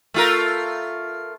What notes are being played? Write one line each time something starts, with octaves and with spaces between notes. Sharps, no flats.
A3 F4 A#4